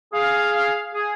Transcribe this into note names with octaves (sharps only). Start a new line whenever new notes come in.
G#4 F5
G#4